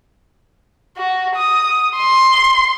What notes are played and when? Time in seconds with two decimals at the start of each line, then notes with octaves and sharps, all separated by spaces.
0.97 F#4
1.35 D#6
1.97 C6